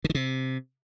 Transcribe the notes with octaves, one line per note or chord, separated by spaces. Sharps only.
D3
D#3
C3